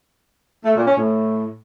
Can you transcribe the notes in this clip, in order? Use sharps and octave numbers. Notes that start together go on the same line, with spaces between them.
A3
A#2
C#4
A2